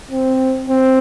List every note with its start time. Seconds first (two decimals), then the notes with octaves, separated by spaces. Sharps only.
0.11 C4
0.70 C4